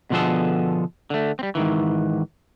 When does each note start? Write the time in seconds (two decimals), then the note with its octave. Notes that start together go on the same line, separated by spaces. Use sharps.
0.10 B2 D3 F3 B3 G#4 A4
1.10 D3 A3
1.39 G3 C4
1.55 G#2 D#3 E3